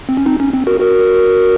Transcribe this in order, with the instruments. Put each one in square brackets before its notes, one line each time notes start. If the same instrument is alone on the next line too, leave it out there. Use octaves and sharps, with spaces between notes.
[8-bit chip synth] C4
C#4
C4 D#4
C#4
C4
F#4 A#4
F#4 A#4